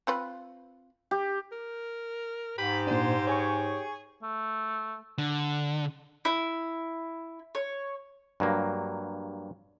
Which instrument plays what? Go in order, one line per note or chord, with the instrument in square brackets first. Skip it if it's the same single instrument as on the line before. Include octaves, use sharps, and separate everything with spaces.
[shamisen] C4 F4 B4
[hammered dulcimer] G4
[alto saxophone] A#4
[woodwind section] G#2 [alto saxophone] G4 [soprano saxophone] B5
[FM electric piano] A#2 D4 [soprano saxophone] C5
[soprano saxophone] G#4 [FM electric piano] C#5 G#5 C#6
[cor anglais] A3
[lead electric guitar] D3
[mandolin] E4
C#5
[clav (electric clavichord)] G2 F#3 A#3